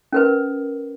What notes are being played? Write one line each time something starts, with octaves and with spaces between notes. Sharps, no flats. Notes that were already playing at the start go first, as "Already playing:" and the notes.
C#4 A#4 B4